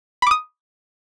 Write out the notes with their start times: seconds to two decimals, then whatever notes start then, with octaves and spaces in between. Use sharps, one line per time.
0.22 B5
0.27 D6
0.31 D#6